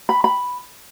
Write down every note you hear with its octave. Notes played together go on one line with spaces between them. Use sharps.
B5
B5